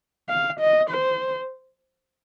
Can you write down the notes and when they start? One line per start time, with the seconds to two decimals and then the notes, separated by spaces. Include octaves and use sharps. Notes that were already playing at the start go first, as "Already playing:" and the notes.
0.29 F5
0.60 D#5
0.90 C5